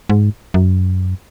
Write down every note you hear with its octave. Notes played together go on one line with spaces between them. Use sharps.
G#2
F#2